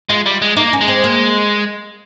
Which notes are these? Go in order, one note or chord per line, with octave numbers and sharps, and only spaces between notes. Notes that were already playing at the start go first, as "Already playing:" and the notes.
G#3 F4
G3
G#3
A#3 D#4
C#4
G#3
C4
A#3